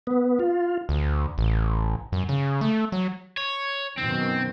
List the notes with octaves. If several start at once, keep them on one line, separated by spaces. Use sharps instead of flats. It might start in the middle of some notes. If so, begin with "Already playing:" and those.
B3
F4
D2
A1
F#2
C#3
A3
F#3
C#5
F#2 B2 D#3 C4